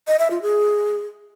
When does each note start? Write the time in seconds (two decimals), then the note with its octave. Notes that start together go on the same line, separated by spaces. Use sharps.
0.07 D#5
0.19 E5
0.30 F4
0.42 G#4